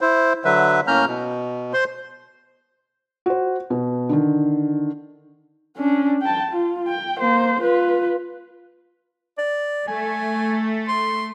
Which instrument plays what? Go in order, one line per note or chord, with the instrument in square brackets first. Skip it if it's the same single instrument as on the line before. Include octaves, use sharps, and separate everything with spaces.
[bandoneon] E4 C5
D3 F#3 B4 E5
A2 A#3 C#4 A#5 F6 G6
B2
C5 C6
[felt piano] F#4 C5
B2
D3 D#3
[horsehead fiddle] C#4 D4
G5 A5
F4
G5
A#3 C5
F4 B4
[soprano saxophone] D5
[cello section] A3 [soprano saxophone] G#5
[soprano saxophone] C6